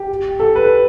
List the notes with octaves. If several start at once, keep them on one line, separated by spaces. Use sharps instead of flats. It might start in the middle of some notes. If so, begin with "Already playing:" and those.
Already playing: G4
A4
B4